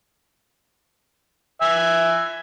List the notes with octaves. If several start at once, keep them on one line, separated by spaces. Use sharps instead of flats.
E5 G#5